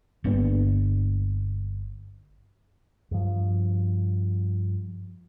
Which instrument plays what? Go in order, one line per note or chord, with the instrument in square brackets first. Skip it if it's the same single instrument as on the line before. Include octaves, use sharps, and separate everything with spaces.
[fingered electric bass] G1 A#3 B3 D4
G2 F3